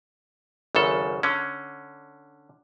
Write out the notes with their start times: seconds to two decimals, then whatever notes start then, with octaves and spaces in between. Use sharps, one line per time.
0.75 G#1 F#2 C#3 A4
1.23 D3 C#4